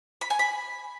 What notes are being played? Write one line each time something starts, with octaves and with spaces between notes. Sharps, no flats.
B5
G#5
B5